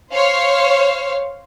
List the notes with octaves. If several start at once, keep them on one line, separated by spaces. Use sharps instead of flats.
C5 C#5 F5